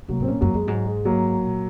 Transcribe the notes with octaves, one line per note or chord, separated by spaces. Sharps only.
C3 F#3 A#3
G#2 C4
A#2 A#3 C#4
F#2 F#3 A#3
F#2 G#3
G#2 F#3
G#3
F#3 A#3
A#2